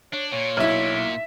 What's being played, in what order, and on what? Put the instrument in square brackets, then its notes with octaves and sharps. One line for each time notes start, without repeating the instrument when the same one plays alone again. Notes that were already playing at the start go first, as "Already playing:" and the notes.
[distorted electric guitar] D4 [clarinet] C#5
[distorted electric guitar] A#2 [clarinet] C#5
[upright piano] B1 E4 [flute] E5